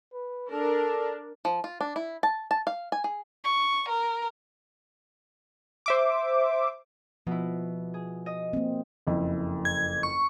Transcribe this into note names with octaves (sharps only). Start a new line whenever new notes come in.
B4
D4 A4 A#4
F3
F4
D4
E4
A5
A5
F5
G#5
G#4
C#6
A#4
C5 E5 D6
B2 F3 E4
G#4
D#5
A#3 C4
F#1 F2 E4
G#6
C#6